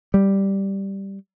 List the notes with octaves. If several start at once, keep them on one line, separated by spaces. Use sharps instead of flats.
G3